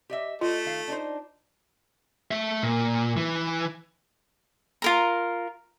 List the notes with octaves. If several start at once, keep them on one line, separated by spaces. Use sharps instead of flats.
G4 D#5 E5
A3 F4 D#5
D#3 F5
D4 D#4 C5
A3 E5
A#2
E3
F4 A#4 A#5